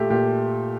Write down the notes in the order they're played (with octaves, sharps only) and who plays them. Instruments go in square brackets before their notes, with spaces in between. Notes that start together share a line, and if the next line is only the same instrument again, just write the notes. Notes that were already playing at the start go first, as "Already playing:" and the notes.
Already playing: [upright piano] A#2 A3 G4
A#2 G4